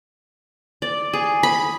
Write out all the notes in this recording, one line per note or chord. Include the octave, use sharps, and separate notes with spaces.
D5
G#4
B5